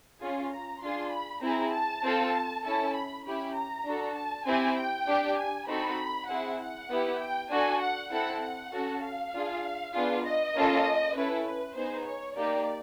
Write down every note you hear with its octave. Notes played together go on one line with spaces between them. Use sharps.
C#4 F4 G#4
A#5
D4 F4 G#4 C6
B5
C4 E4 G#4 A#5
A5
C4 F4 A4
C#4 E4 A4 A5
B5
C#4 E4 G4 B5
A#5
D4 F#4 A4
A5
C4 E4 G4 G#5
G5
D4 G4
G#5
C4 D#4 F#4 A4 B5
C4 E4 G#4 F#5
F#5
B3 E4 G4
G5
D4 F#4 A4 G#5
F#5
C4 E4 A4 F#5
F#5
C#4 F#4 A4
F5
D4 F4 G#4
B3 D4 F4 G#4
D#5
A#3 C#4 F4 A4
C#4 E4 A4 B4
B4
B3 D#4 G#4 C5
C#5
A#3 D#4 G4 D5